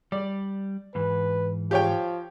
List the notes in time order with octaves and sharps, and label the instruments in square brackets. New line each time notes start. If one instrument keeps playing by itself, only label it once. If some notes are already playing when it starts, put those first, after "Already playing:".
[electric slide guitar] G3 [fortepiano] D5
[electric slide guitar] G#2 E3 [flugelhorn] B4
[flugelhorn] F3 [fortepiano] G4 C#5 G5